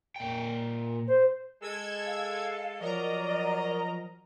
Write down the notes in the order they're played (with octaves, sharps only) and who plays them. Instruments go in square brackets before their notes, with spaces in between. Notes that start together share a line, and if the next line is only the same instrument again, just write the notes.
[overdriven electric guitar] A#2 G5
[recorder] C5
[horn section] G#3 A4 [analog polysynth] E6 G#6
[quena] F5
[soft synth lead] F3 [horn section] F#3 D#5 [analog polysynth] A#4 A#5 [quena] D5